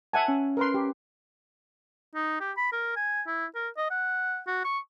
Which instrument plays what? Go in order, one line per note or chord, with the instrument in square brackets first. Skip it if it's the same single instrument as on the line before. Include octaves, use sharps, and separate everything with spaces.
[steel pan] E5 F#5 G#5 [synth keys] A5
[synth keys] C#4
[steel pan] A#4 B4 C6
G4
[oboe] D#4
G4
B5
A#4
G#5
E4
A#4
D#5
F#5
F#4
C#6